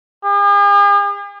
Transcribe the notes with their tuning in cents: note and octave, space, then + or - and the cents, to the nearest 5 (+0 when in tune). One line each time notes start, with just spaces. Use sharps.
G#4 -45